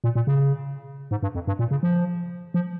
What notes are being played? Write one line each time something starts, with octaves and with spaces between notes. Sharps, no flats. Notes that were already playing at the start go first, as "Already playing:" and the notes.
A#2
A#2
C#3
G#2
G2
F2
G2
A#2
C#3
F3
F3